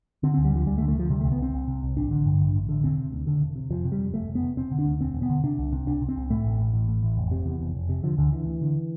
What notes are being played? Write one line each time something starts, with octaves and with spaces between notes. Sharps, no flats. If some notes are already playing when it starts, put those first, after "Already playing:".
D3 C4
C4
D2
G3
D3 F3
D2 G3
A3
D3
A3
D2 F3
C3 G3
A3
C2
B3
C3 C4
C2
C3
C2
A1 D4
D3
G2
A1
A1
D3
E1 C4
C3
D2
E1 D3
E1
C3
F1 F3
C3
G3
F2
F1 A3
F1
B3
C3
E1 C4
D3
D4
D2
E1 C4
E1
B3
D3
C3 D4
C2
C3
C2 D4
C3
C4
C2
A2 A3
A1
A2
A1
A2
A1
F1
C3
E2
F1
F1
C3
D3 F3
D2 D3
D3 E3
D2
D3